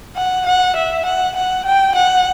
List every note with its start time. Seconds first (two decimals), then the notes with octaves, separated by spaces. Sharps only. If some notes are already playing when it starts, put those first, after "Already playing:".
0.16 F#5
0.47 F#5
0.76 E5
1.06 F#5
1.36 F#5
1.65 G5
1.95 F#5